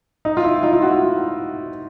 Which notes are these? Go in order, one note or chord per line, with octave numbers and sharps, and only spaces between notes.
D#4
F4
E4
D#4 F4
F4
E4 F#4